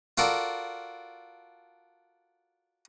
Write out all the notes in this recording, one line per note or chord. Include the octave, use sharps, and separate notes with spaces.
F4 F#4 A4 A#4 D5